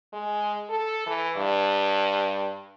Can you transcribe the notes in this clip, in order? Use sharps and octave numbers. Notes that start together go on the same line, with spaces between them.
G#3
A4
E3
G2